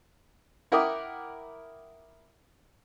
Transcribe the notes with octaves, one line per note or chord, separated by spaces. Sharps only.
E4 A#4 F#5 G5 D6 D#6